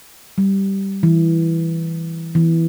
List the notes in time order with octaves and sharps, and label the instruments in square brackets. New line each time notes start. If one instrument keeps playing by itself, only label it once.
[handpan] G3
E3
E3